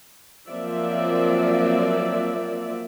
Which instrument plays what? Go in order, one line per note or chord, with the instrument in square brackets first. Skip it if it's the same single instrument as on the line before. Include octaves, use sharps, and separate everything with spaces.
[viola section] F3 F#3 A#3 C4 D5 E5